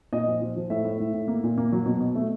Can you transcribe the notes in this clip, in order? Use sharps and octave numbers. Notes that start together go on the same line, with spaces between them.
A#2 D#5
F3
F3
F3
A2 E5
A2
A2
A2
A#3
A#2
A#3
F#3
B2
B2
A3